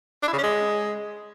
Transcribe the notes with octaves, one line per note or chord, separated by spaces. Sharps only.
D4
E4
C#3
C#4
G#3